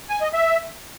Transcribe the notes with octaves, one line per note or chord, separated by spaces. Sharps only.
G#5
D#5
E5